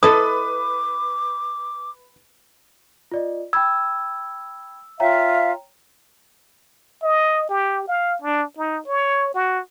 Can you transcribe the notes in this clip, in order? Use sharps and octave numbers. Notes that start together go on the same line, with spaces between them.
E4 A4 B4 D#5 D6 D#6
F4 D5 D#5
G5 B5 E6 G#6
F4 C#5 E5 F5 G5 A#5
D#5
G4
F5
D4
D#4
C#5
F#4